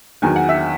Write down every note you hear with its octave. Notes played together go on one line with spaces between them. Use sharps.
E2 D#3 F#3 G#5
F#5
E5